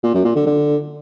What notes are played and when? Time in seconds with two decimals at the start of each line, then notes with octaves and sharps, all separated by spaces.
0.03 A#2
0.14 F#2
0.25 A#2
0.35 D3
0.46 D3